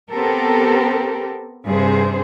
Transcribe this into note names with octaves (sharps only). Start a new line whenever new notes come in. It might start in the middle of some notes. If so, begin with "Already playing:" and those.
B3 C4 G4 A4 A#4
G2 C3 G#4 C5